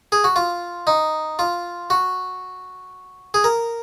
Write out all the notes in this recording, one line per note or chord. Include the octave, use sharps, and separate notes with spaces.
G#4
F#4
F4
D#4
F4
F#4
G#4
A#4